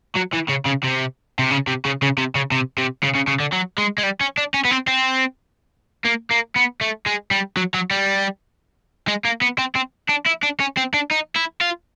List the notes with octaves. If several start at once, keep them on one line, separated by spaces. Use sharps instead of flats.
F#3
E3
C#3
C#3
C3
C3
C#3
C3
C#3
C#3
C3
C#3
C3
C3
C#3
C#3
C#3
D3
F#3
G#3
G#3
G3
C#4
D4
C#4
B3
C4
C4
A#3
A#3
B3
A3
G#3
G3
F#3
F#3
G3
G#3
A#3
B3
C4
C4
D4
E4
D4
C#4
C4
D4
D#4
E4
F4